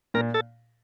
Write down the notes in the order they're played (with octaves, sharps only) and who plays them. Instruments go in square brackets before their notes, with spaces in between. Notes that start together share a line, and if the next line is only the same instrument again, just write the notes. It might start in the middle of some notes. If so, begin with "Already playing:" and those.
[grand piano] A#2 [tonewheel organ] A#4
[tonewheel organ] A4